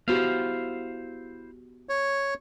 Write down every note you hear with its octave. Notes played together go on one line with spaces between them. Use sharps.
B3 E4 F#4 G4 C5 F5
C#5